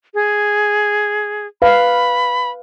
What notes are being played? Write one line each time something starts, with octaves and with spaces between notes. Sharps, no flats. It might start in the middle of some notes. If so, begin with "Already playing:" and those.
G#4
B4 F5 B5